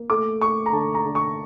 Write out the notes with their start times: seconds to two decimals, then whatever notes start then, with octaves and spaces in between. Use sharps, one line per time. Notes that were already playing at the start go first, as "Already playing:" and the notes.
Already playing: A#3
0.10 A3 D6
0.41 A3 C#6
0.66 A#5
0.72 D3 A5
0.94 A#5
1.05 D3
1.15 C#6